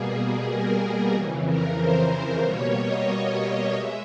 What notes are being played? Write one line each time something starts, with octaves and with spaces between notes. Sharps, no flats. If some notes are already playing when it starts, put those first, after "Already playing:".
Already playing: B2 G3 A#3 G#4
G#4
A#4
F2 C#3 E3
A#4
C5
B2 G3 A#3 C#5
D#5
D#5
G#3 E5